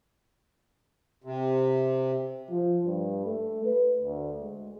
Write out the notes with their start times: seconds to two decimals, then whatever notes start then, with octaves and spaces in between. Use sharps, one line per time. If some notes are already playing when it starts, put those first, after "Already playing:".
1.24 C3
2.50 F3
2.85 G2
3.25 A3
3.65 B4
4.01 D2
4.41 G#3